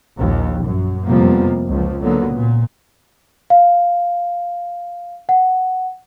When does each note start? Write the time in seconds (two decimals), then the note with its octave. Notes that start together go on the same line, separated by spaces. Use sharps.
0.16 A#1 D#2
0.64 F#2
1.05 F2 C3 F3 G3 A#3 B3
1.69 C#2 F3
2.02 D3 F#3 A#3 B3
2.34 A#2
3.50 F5
5.29 F#5